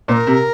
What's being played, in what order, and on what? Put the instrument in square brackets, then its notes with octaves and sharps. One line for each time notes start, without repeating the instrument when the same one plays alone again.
[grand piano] A#2 [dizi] C5
[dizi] A#4
[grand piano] C3